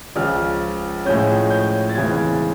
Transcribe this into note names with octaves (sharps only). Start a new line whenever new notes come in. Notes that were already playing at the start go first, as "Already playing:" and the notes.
C#2 C#3 F3 F6
A2 F3 G#3 C#4 G6
G6
A6
D#2 C#3 E3 G#3 C4 G#6